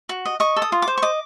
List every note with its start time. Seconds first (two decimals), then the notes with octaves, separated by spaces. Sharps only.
0.09 F#4
0.25 D#5
0.40 D#5 C#6
0.56 A4
0.62 D#6
0.72 F4
0.82 D6
0.88 C5
0.97 C#6
1.02 D#5 D6